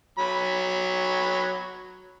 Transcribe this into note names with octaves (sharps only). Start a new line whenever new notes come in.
F#3 B5